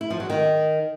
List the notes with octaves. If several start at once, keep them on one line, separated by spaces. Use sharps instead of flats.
E4
F3
F#3
D#3